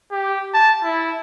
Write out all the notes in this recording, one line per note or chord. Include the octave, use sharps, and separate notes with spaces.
G4
A5
E4